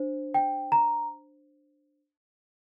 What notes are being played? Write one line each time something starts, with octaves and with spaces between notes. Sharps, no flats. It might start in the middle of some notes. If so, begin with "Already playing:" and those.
Already playing: D4 C5
G5
A#5